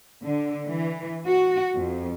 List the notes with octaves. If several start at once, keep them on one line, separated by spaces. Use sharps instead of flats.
D3
E3
F#4
F2